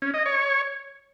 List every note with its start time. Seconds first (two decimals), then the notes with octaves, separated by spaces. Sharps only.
0.02 C#4
0.14 D#5
0.26 C#5